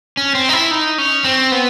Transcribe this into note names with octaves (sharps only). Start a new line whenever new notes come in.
C#4
C4
D#4
E4
D#4
C#4
C4
B3